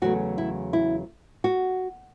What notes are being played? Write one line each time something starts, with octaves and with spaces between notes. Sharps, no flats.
E2 C#3 F#3 A3 F#4
E4
E4
F#4